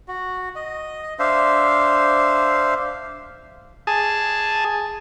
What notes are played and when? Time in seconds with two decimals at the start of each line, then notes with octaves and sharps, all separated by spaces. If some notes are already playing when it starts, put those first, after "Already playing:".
0.08 F#4
0.56 D#5
1.19 D4 C5 E5 F5
3.87 G#4 A5